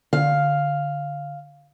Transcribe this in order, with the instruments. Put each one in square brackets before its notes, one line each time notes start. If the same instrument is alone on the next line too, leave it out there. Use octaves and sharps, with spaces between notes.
[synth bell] D3 [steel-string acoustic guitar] F5